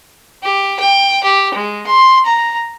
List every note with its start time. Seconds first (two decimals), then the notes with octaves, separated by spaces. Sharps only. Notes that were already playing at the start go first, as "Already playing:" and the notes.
0.43 G4
0.80 G5
1.24 G4
1.54 G#3
1.86 C6
2.25 A#5